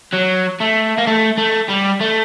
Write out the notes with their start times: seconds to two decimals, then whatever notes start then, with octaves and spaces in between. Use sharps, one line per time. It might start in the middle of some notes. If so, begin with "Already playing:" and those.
0.13 F#3
0.60 A3
0.98 A#3
1.07 A3
1.38 A3
1.69 G3
2.01 A3